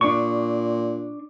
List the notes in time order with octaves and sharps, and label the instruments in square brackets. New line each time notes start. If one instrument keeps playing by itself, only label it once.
[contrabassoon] A#2 [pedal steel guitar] D4 C#6